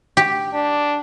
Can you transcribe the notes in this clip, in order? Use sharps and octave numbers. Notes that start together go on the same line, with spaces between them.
G4
D4